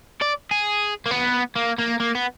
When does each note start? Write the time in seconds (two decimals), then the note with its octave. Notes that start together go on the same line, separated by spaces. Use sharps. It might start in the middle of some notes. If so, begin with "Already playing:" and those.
0.22 D5
0.51 G#4
1.06 A#3
1.11 B3
1.56 A#3
1.78 A#3
2.00 A#3
2.15 B3